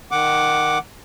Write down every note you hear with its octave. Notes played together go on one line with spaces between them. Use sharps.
D#3 F#5 D6